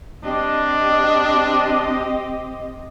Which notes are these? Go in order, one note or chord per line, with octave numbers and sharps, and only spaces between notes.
C4 D4 G4 D#5